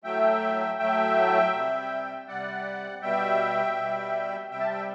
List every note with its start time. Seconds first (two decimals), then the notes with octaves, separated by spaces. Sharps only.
0.04 A2 F#3 A3 E5 G5
0.79 A2 F#3 A3 E5 G5
1.53 C3 G3
2.28 C3 G3 D5 F#5
3.02 B2 G3 E5 G5
3.76 B2 G3
4.51 C3 G3 E5 G5
4.61 A5
4.70 E5 G5